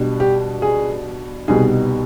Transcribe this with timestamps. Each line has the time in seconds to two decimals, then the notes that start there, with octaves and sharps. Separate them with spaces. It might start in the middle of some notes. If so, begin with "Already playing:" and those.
Already playing: B2 G3 D4
0.20 G4
0.62 G#4
1.48 C2 B2 G3 B3 D#4 G#4